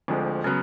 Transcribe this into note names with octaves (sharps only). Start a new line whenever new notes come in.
D2 D3 F3 G#3 C4
C#3 F#3 B3